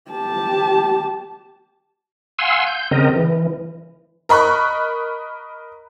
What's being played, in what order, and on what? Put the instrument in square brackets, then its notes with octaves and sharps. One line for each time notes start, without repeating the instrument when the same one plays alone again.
[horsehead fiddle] G4 A5
[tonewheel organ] F5 F#5 G#5 C6 E6
G6
C#3 C4 A#4 D#5
E3
[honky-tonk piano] A#4 D#5 B5 C#6 F#6